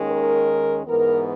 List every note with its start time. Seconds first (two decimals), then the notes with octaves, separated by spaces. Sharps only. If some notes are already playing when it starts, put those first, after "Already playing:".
Already playing: D#2 D#3 G#3 C#4
0.09 A#4
0.86 G#2 E3 B3 A#4